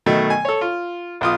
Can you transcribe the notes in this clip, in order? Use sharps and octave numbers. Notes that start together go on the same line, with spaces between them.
B2 D#3 F#3 A3
G#5
A4 C#5
F4
B1 F4 D#6